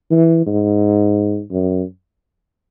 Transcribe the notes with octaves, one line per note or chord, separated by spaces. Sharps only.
E3
G#2
F#2